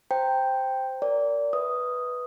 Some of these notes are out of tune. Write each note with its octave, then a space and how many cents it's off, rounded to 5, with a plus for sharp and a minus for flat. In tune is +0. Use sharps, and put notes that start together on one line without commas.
C5 +0 G5 +0 A#5 -15
A#4 -5 D5 -25
B4 +0 E5 -35 D#6 +0